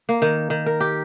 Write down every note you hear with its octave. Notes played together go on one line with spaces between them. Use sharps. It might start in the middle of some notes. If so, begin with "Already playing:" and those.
A#3
D#3
D#3
A#4
G4